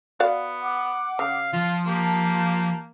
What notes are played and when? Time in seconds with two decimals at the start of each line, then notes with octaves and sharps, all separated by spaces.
0.20 B3 F#4 D5 F5
0.60 F#5 D6
1.19 C#3 F5
1.53 F3 F4 C6
1.86 A#3 G4 A5